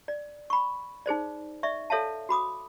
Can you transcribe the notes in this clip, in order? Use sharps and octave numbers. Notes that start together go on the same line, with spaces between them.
D5
B5 C#6
D#4 G#4 C5 D5
D5 E5 C#6
A4 C#5 E5 F5 A5
F#4 B5 D6 D#6